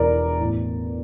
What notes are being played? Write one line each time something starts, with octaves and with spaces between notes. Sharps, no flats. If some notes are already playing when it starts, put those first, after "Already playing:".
Already playing: E1 E2 E3 A#4 D5
A1 A2 E3